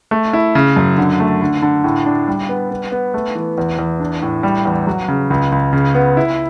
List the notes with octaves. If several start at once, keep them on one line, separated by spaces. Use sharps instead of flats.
A3
E4
C#3
F#2
D3
A3
D3
D3
A2
D4
G3
B3
B3
B3
A3
E3
E2
E2
D4
A2
G3
E2
F#3
C#3
C#2
C#2
C#3
B3
E4